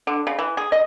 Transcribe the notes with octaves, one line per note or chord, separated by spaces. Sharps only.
D3
C#3
E3
G#4
D#5